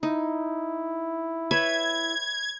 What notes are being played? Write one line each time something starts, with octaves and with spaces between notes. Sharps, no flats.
D#4 E4
B4 C#5 E5 G#6